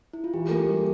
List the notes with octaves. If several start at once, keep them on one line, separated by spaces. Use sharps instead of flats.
E4
F4
E3 G4
A#3 A4
G4
G3